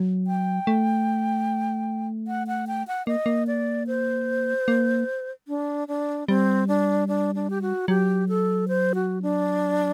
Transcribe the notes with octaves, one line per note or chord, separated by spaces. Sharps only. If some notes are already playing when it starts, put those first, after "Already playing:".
Already playing: F#3
G5
A3
F#5
F#5
G5
F#5
A#3 D#5
A#3
D5
C5
A#3
D4
D4
G3 C4
D4
D4
D4
G4
F#4
F#3 G4
A4
C5
F#4
D4